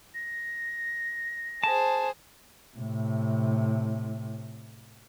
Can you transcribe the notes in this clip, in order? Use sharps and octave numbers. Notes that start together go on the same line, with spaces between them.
A#6
G#4 C5 A5
A2 C3